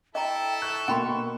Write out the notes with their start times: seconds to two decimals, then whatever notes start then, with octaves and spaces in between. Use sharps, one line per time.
0.15 E4 A4 D#5 G5 A#5
0.62 C#6 F#6
0.88 B2 A#3 G5 B5 C6